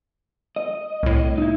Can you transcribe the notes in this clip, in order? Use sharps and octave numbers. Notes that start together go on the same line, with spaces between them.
D#5
C2 A2
D#4 E4